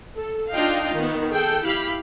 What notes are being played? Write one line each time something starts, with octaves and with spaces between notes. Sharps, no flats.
A4
D4 D#4 F4 D#5 F5 G5
D#3 B3
G#4 A4 G5
E4 G4 F5 B5